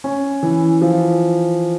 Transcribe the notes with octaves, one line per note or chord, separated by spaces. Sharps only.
C#4
E3
F3